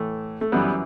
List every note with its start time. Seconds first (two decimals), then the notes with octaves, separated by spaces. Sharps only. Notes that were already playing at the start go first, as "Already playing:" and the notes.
Already playing: A2 E3 A3
0.41 A3
0.52 F#2 E3 G3 B3